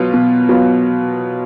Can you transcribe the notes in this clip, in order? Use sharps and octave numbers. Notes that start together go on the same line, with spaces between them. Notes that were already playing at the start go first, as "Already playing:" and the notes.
Already playing: B2 F#3 B3 F4
B2
F#3 B3 F4